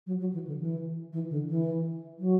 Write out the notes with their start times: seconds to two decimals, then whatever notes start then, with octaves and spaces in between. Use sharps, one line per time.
0.07 F#3
0.20 F#3
0.33 E3
0.47 D3
0.60 E3
1.13 E3
1.30 D3
1.49 E3
2.19 F#3